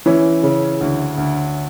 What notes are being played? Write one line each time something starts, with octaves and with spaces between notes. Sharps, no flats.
E3 C#4 E4
C#3
D2
D2